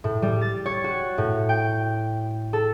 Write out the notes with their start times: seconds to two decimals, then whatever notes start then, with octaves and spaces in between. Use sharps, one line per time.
0.04 A2
0.22 G3
0.41 A6
0.66 C#5
0.84 F#4
1.18 A2
1.49 G5
2.53 A4